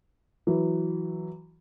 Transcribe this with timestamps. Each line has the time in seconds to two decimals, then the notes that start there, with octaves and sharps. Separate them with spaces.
0.47 E3 F#3